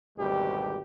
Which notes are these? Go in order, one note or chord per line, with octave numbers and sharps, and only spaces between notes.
G#1 D2 B2 G3 G4